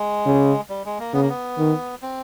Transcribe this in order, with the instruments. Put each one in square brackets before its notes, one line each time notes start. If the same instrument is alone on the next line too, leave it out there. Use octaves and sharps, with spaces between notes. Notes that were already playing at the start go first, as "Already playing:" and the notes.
Already playing: [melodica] G#3
[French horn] C#3
[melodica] G3
G#3
A#3
[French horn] C#3 [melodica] B3
[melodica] A#3
B3
[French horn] D#3
[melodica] C4